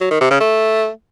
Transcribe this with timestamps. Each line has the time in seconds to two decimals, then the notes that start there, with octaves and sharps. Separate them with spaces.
0.01 F#3
0.11 D#3
0.21 C3
0.30 C#3
0.40 A3